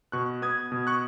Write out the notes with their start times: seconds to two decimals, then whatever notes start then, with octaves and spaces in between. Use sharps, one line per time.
0.12 B2 C#6 F#6
0.42 B3 D#6 G#6
0.72 B2
0.87 C#6 F#6